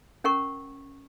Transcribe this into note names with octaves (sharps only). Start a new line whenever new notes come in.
C#4 A#4 F#5 C#6